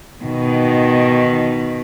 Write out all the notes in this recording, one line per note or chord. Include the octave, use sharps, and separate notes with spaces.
B2 D#3